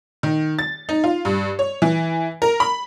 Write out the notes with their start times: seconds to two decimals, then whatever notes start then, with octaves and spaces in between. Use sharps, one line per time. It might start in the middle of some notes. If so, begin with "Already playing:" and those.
0.23 D#3
0.59 A6
0.89 D#4
1.04 F4
1.25 G2
1.59 C#5
1.82 E3
2.42 A#4
2.60 B5